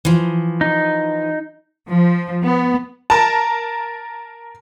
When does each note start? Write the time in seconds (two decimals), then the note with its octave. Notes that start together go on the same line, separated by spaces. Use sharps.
0.05 E3 F3
0.61 D#4
1.89 F3
2.44 B3
3.10 A#4 A5